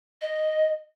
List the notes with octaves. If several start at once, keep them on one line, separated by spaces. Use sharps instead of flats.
D#5